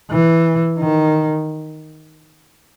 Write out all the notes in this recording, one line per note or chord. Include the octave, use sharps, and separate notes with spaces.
E3
D#3